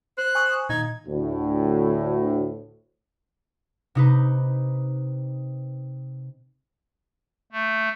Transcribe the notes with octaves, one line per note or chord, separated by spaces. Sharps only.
C5 F#6
G#5 C#6 D#6
A#2 D#3 D#4 G#6
D2 A2
C3 D#4 B4
A3